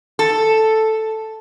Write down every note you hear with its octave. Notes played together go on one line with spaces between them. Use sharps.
A4